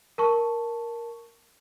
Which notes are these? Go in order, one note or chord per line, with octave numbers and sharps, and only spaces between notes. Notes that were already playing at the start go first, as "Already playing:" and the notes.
A#4 A5 C#6